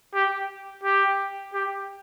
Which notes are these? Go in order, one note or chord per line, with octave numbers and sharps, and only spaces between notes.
G4
G4
G4